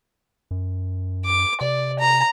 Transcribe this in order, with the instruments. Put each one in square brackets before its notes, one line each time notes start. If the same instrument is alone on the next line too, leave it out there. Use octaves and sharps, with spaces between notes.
[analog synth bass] F#2
[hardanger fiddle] D6
[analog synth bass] C3 [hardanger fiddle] D5
[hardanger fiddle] A#5